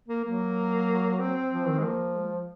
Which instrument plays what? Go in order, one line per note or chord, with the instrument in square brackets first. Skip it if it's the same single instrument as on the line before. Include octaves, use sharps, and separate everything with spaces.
[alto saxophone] A#3
[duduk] F#3 [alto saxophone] A#3
[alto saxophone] C4
[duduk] F3
D#3
[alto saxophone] G#3
[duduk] F3 [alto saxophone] A#3
[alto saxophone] G#3